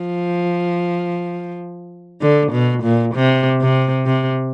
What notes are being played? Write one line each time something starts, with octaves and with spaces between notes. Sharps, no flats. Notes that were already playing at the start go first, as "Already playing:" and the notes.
Already playing: F3
D3
B2
A#2
C3
C3
C3